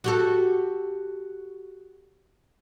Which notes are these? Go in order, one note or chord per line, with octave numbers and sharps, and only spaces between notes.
F#4 G4 A4